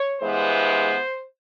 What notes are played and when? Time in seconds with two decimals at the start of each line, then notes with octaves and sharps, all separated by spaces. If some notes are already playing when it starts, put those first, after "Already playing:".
Already playing: C#5
0.20 G2 E3 G#3 B3 C5